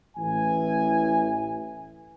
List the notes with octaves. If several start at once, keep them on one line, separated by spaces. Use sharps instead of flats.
A1 E3 G#5